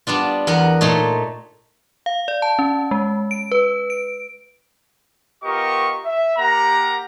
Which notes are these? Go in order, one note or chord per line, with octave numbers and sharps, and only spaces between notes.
G3 B3 D4 F4
E2 B3 A#4 F#5
A#2 A3 D#4 C#5 C6
F5
D5
A5
C#4
G#3
D7
B4
D7
B3 F4 G4 A#4 D#5 C#6
E5
A#3 G4 A#4 F#5 A#5